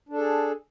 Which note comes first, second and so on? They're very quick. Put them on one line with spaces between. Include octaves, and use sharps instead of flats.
D4 A4 G#4